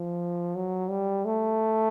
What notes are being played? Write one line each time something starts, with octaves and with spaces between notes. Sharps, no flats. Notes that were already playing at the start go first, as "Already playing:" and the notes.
Already playing: F3
F#3
G3
A3